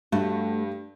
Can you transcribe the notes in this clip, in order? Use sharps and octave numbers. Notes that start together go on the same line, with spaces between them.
G2 A3 F#4